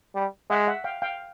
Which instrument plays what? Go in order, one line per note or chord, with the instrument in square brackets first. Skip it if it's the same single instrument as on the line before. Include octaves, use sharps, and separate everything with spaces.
[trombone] G3
[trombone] G#3 [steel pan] E5 F#5
[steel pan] E5 F#5
F5 G5
F5 G5